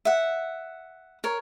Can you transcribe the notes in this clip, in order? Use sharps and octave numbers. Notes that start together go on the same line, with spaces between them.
E5 F#5
A#4 C#5